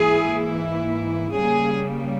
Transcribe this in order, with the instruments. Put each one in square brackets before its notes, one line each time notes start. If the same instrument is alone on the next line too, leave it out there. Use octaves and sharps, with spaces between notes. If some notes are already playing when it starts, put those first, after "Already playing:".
Already playing: [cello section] G#2 E3 A#3 E4 G#4
C#3 G3 A#3 G#4